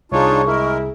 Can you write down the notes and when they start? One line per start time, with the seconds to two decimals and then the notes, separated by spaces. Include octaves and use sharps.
0.12 C2 D4 D#4 F4 G#4 C#5 C#6
0.47 G#3 E4 A#4